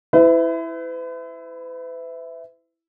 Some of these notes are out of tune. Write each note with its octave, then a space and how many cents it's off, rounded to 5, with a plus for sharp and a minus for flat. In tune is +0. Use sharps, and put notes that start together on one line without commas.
E4 +0 B4 +40